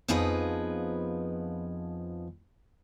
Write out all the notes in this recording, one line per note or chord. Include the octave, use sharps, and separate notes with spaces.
F2 F3 B3 D#4 G#4 B4